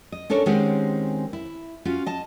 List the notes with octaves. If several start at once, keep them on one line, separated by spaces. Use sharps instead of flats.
D#5
C#4 D4 A4 A#4 C#5
D#3 G#3 C4 C#4 G4 F#5
E4
C#4 F4 F#4
D#5 A5